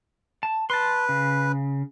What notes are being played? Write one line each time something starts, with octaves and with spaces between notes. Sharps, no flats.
A5
B4 A5 C6
C#3